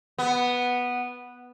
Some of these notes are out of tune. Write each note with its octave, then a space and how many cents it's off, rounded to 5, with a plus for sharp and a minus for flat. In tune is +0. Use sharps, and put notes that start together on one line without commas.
B3 -5